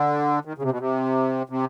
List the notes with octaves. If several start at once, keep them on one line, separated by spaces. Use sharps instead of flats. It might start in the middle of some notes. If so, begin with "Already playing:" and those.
Already playing: D3
D#3
C#3
C3
B2
C3
C3